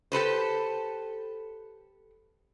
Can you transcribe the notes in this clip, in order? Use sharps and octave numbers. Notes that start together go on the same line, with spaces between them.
G4 A4 B4 C5